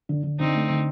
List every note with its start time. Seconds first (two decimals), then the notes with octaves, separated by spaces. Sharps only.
0.09 D3
0.23 D3
0.39 D3 C4 D#4
0.54 A3
0.70 D3